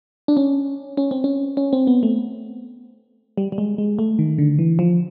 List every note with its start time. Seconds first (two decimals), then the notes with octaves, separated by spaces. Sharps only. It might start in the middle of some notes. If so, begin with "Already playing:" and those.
0.28 D4
0.37 C#4
0.97 C#4
1.11 C4
1.24 C#4
1.57 C#4
1.73 C4
1.87 B3
2.03 A3
3.38 G3
3.52 G3
3.58 G#3
3.78 G#3
3.99 A3
4.19 D#3
4.38 D3
4.59 E3
4.79 F3